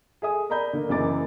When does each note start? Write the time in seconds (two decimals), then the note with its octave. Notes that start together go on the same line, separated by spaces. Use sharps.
0.22 G#4 A4 E5 G#5 D#6
0.50 A#4 D5 D#5 A#5 B5 G6
0.73 D3 A#3
0.89 F#1 F#2 E3 A#3 D6 A6